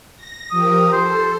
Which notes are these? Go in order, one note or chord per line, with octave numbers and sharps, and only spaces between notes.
A#6
F3 G4 A#4 D#6
A4 C5